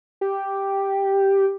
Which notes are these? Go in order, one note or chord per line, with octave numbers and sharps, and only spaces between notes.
G4